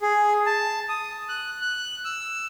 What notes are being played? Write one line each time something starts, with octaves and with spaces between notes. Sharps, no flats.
G#4
A5
D#6
F#6
F#6
E6